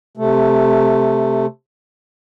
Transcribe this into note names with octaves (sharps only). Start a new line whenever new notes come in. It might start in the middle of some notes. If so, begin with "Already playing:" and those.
C3 A3